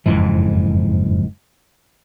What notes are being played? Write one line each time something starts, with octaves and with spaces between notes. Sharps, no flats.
F#1 F2 G#2 E3